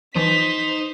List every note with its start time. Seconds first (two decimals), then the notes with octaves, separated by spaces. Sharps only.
0.16 E3 F3 D#4 C5 B6